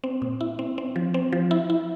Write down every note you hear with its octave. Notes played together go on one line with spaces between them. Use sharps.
C4
A#2
E4
C4
C4
F3
C4
F3
E4
E4